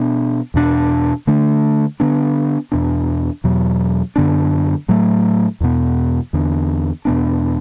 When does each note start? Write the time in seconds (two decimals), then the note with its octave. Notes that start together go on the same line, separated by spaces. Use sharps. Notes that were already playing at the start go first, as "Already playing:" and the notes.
Already playing: B2 B3 D4
0.54 E2 B2 B3 D4
1.27 D3 A3 D4
2.00 D3 B3 D4
2.72 E2 B2 B3 D4
3.44 E2 B2 F#3
4.16 F#2 D3 B3 D4
4.88 A2 F#3 A3
5.61 E2 B2 B3
6.33 E2 D3 B3 D4
7.05 E2 B2 B3 D4